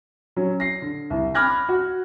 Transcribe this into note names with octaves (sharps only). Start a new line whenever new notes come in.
F#3 C#4
A#6 C7
D3
C2
B5 D6 F6 F#6 G#6 A#6
F#4